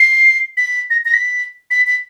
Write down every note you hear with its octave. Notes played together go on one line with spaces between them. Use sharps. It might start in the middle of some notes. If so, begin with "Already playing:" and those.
Already playing: C7
B6
A#6
A#6
B6
B6
B6